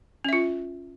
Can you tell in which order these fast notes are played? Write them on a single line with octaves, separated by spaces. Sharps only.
C#4 E5 F4